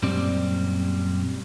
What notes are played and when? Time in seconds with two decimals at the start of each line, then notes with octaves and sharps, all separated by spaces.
0.03 F#2 A#2 G3 C4 D5